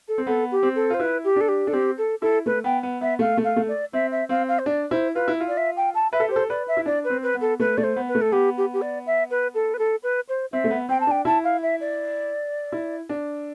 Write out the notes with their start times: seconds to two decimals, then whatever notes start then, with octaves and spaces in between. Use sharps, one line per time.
0.08 A4
0.18 C4
0.27 B3 A4
0.51 G4
0.63 C4
0.75 A4
0.90 F4 C5
1.00 E4 B4
1.24 G4
1.36 D4 A4
1.48 G4
1.67 D4 A4
1.73 C4 G4
1.98 A4
2.21 E4 A4
2.46 A3 B4
2.64 B3 G5
2.83 B3
3.01 B3 E5
3.19 A3 F5
3.38 A3
3.44 F5
3.56 A3
3.68 D5
3.93 C4 E5
4.11 E5
4.29 C4 F5
4.48 F5
4.59 C5
4.66 D4 D5
4.91 E4 C5
5.15 F4 B4
5.28 E4
5.40 F4
5.48 D5
5.57 E5
5.77 G5
5.95 A5
6.12 B4 E5
6.20 A4
6.28 G4 C5
6.36 A4
6.50 B4 D5
6.68 E5
6.77 E4
6.86 D4 D5
7.04 B4
7.10 C4
7.23 B4
7.34 B3
7.41 A4
7.60 A3 B4
7.77 A3 D5
7.83 C5
7.96 B3
8.08 B4
8.15 A3
8.21 A4
8.32 B3 G4
8.57 G4
8.73 G4
8.81 D5
9.06 E5
9.30 B4
9.54 A4
9.74 B4
9.79 A4
10.03 B4
10.29 C5
10.52 C4 E5
10.64 A3
10.71 B3
10.89 C4 G5
11.00 A5
11.07 D4 G5
11.25 E4 A5
11.44 F5
11.63 E5
11.80 D5
12.72 E4
13.09 D4